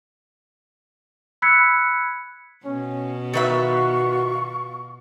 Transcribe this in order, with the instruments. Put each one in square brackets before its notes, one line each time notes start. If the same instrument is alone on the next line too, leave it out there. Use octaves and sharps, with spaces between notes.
[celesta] B5 E6 F#6 G#6 B6 C#7
[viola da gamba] B2 [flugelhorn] C#4
[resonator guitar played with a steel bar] D#3 B4 E5 [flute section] F4 C#6 [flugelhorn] F#4